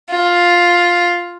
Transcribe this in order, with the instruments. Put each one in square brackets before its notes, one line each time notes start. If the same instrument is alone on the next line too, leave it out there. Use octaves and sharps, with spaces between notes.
[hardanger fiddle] F4